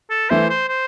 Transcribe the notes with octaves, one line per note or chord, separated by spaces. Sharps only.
A4
E3 A3 E4 C5
C5
C5